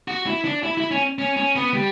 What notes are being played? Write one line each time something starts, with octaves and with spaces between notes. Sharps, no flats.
F#4
E4
D4
E4
E4
C#4
C#4
C#4
B3
G3